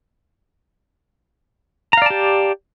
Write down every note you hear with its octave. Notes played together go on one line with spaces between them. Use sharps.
G4 D5 F5 A5 A#5